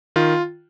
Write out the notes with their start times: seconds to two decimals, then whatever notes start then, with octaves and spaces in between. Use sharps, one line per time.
0.16 D#3 F4